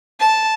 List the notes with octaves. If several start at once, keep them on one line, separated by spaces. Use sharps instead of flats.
A5